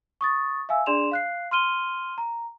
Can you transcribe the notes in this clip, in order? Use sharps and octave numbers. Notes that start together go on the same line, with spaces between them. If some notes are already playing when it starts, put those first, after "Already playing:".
C#6 D#6 A6
E5 F5 G#5 E6
D4 G#4 D5 C6 E7 F7
F5 F#6 C7
C6 F6 D#7 G7
A#5